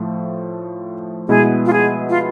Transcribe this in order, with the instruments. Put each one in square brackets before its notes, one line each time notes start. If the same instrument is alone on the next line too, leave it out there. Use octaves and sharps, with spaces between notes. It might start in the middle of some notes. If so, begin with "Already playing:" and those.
Already playing: [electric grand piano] A2 F3 A3
[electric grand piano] B2 G#3 B3 E4 [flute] G#4
[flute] F4
G#4
F4